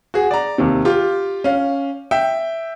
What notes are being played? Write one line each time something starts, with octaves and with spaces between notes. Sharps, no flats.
F#4 G#4
D5 A#5
D#2 C3
F4 G4
C#4 F5
E5 G5